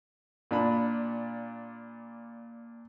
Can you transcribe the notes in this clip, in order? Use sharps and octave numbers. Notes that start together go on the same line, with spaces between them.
A#2 D4 B5